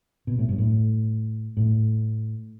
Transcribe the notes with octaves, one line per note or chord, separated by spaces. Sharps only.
B2
A2
G2
A2
A2